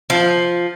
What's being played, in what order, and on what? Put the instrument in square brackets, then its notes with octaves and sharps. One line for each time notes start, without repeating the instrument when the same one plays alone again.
[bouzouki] F3